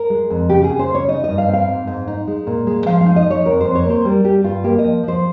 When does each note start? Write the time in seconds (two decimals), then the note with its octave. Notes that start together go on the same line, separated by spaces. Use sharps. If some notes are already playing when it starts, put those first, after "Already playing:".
Already playing: A#4
0.10 G#3
0.30 F2
0.49 C#3 G4
0.64 G#4
0.69 C#3
0.79 C5
0.89 C#3
0.95 C#5
1.09 D#4 D#5
1.24 G2 D#5
1.38 F5
1.48 C4
1.53 F5
1.68 G#2
1.87 G#2
2.07 D#4
2.27 G#3
2.47 A#2
2.67 G#3
2.86 F3 F5
3.01 F5
3.06 D#4
3.16 D#5
3.26 F3 C#5
3.45 F2 A#4
3.60 F2 C5
3.75 C#5
3.85 A#3 C5
4.05 G3 A#4
4.24 G3 G4
4.44 G2 F4
4.64 A#3 G4
4.79 F3 D#5
5.03 F3 C5